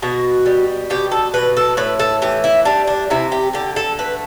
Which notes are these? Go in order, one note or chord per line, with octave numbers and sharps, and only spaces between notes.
B2 F#4
G3
B2 G4
A4
B2 B4
A4
A2 B4
A4
E3 G4
E4
G3 D4
D4
C3 E4
G4
D3 G4
A4
A3 B4